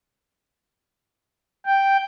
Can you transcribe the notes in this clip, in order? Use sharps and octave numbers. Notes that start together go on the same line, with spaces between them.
G5